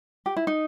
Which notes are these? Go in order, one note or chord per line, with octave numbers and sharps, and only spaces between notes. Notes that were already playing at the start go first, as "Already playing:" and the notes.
G4
E4
D#4